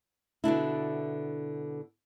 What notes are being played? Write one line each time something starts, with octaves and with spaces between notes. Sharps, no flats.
B2 D3 D4 E4